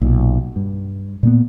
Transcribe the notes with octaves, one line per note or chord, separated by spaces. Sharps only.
B1 A#2
G2
A#2 A#3 B3